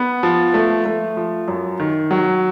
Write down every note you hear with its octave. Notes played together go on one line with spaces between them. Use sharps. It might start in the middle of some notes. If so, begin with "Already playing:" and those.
Already playing: B3
F3
A3
A3
F3
F#2
D#3
F#3